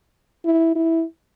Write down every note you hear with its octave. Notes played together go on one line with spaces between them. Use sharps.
E4
E4